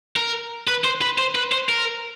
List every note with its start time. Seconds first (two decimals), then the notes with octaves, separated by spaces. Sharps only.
0.16 A#4
0.68 B4
0.84 C5
1.01 B4
1.18 C5
1.35 B4
1.52 C5
1.69 A#4